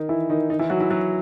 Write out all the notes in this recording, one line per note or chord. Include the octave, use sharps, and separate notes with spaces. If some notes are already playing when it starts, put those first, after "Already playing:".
Already playing: D#3 D#4
E3 E4
D#3 D#4
D#3 D#4
E3 E4
F#3 F#4
E3 E4
F#3 F#4